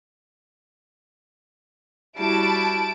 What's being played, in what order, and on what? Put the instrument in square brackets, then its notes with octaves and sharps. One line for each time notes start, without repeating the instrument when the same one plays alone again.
[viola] G3 F#4 [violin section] E4 A5 D7